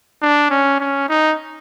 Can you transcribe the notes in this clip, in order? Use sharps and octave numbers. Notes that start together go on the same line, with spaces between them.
D4
C#4
C#4
D#4